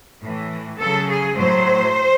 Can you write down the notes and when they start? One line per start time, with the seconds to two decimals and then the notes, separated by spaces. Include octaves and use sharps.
0.21 A2 E3
0.79 C#3 F#3 A4
1.08 G#4
1.36 A2 F#3 C5